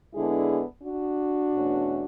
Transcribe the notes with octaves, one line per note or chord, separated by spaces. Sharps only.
D3 G#3 B3 D4 E4 G#4
D4 F#4
E2 B2 A3 C#4